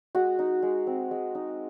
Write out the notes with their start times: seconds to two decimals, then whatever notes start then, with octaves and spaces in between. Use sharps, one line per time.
0.15 G#3 F#4
0.39 D#4
0.63 G#3
0.87 C4
1.11 G#3
1.35 D#4